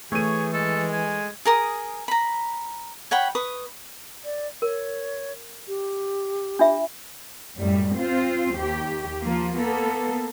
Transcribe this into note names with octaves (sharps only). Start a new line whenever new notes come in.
E3 A3 G#4 C#5 D#7
G#3 A4
G#5
G#4 A#4 D#6
A#5 B5
C#5 F#5 G5 B5
B4 C#6 D#6
D5
A#4 C#5
G4
D4 F4 E5
F#2 A2 G3
C4 F4 C5
D#2 G4
F3 A#3 F4
A#3 B3 A4